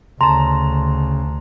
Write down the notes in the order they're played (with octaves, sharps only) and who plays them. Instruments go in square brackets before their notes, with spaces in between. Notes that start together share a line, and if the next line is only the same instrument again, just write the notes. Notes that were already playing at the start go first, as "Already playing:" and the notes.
[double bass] D2 [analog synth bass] C#3 [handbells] A5 A#5 [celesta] C6